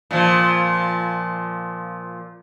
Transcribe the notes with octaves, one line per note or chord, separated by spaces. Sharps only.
A#2 F3